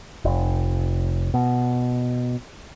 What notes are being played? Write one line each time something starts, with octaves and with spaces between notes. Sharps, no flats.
F1
B2